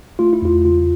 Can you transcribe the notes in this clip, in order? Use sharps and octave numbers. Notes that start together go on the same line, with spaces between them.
A3 F4
E4
E2 F4
C#3 F4